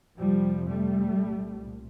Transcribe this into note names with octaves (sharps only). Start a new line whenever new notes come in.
F2 C3 F3 G3
G3 A3
C2 A#2